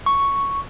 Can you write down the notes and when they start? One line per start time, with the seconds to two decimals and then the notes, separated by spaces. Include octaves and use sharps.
0.06 C#6